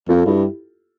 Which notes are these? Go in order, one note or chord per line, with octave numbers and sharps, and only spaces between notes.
F2 F4 A4
G2 E4 G4